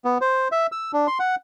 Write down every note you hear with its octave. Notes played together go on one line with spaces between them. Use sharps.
B3
C5
E5
E6
D4
C6
F#5